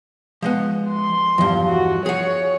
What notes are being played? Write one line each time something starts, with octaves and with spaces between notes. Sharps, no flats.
F3 G#3 B3
C6
E2 G2 F3
F#4
G#4 C#5 F#5